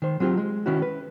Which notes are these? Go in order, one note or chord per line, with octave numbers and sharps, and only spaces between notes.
D#3 C5
F#3 C4 F4 G4
G#3
D#3 C#4 E4 F#4
B4